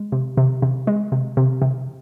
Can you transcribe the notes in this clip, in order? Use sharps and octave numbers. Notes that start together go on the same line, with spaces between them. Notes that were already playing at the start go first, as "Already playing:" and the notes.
Already playing: G#3
C3
C3
C3
G#3
C3
C3
C3